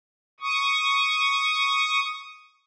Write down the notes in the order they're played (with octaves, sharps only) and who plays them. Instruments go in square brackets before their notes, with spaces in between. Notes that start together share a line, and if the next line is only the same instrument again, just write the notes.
[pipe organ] C#6 D#6